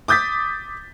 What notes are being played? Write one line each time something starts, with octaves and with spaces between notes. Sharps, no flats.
D6 D#6 G6 A6 B6